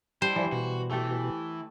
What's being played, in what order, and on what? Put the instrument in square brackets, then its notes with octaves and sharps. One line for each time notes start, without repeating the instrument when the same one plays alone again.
[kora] G3 [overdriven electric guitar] D4 E4 [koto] C5
[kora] E3 [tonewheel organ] F3 G3
[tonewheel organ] B2 [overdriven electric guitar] F#4
[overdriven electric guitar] E3 [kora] A3 G4 A4